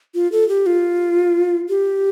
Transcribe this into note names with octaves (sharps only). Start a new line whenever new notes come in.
F4
A4
G4
F4
G4